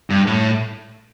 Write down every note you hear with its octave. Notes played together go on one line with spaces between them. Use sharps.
G2
A2